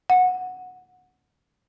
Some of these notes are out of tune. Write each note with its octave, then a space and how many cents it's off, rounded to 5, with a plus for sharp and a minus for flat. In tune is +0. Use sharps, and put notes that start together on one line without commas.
F#5 -10